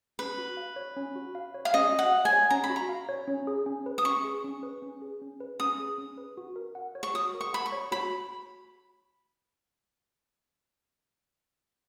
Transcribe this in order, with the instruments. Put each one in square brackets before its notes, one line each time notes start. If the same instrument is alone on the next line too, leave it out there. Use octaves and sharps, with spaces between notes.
[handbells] C#4 [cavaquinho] B4
[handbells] F#4
F5
C#5
C#4
F#4
F5
C#5
[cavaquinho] F5
[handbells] C#4 [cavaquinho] D#5
[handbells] F#4
[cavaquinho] F#5
[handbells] F5
[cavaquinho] G#5
[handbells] C#5
[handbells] C#4 [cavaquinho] A#5
[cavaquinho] B5
[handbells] F#4
[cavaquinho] A#5
[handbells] F5
C#5
C#4
G#4
C#4
B4
[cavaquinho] D#6
[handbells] C#4 [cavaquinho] C#6
[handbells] G#4
C#4
B4
C#4
G#4
C#4
B4
[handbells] C#4 [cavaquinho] D#6
[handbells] G#4
C#4
B4
F#4
A#4
F#5
C#5
[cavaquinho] C#6
[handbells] F#4 [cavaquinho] D#6
[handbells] A#4
[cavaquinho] C#6
[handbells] F#5 [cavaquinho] B5
[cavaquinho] C#6
[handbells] C#5
[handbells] F#4 [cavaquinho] B5